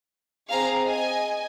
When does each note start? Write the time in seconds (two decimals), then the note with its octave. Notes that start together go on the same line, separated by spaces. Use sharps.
0.50 C4 G#4 F5 A#5
0.87 D#5 G#5